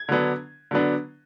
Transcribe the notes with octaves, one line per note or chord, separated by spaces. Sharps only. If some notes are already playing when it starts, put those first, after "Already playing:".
Already playing: G#6
D3 F#3 B3 D4
D3 F#3 B3 D4